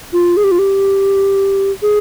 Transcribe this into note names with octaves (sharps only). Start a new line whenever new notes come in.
F4
G#4
G4
F4
G4
G#4